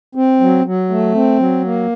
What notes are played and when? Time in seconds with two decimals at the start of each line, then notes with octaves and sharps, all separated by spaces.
0.15 C4
0.40 F#3
0.65 F#3
0.90 A3
1.14 C4
1.39 F#3
1.65 A#3